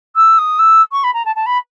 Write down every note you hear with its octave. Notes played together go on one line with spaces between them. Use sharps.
E6
D#6
E6
C#6
B5
A#5
A5
A5
B5